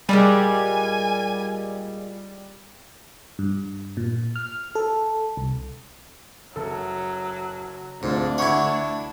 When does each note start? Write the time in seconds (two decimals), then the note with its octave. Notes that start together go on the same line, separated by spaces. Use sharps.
0.09 A#2 D#3 G3 G#3 G#5
3.39 G2
3.97 A#2
4.36 F6
4.75 A4
5.37 C2
6.56 F#1 F#3 A4
8.03 D2 G#2 C4 D4 F4
8.38 E4 C#5 F#5 C#6 G#6